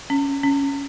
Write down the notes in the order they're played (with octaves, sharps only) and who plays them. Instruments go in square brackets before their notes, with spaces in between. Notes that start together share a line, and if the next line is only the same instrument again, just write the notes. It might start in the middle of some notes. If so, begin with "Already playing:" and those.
[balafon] C#4
C#4